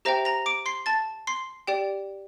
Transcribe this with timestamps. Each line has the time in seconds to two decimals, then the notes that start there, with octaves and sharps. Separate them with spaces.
0.05 G4 C5 E5 G5 A#5 A#6
0.25 A#5 A#6
0.46 D6 D7
0.66 C6 C7
0.86 A5 A6
1.27 C6 C7
1.67 G4 D5 G5